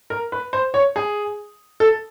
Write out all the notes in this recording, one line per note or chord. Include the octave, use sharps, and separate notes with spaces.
A#4
B4
C5
C#5
G#4
A4